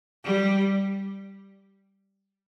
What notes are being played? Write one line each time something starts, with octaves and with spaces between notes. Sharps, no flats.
G3